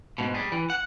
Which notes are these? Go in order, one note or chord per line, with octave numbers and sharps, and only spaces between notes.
G#2 B2
G3 G#4
E3
F#5